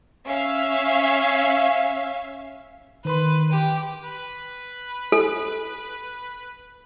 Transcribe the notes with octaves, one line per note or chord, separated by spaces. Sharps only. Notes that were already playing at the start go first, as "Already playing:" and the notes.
C#4 E5 F5
D#3 B4 B5 C6
G4
B4
A4